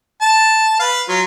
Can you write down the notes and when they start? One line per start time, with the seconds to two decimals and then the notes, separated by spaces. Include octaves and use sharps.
0.21 A5
0.80 B4 F5
1.08 F#3 F4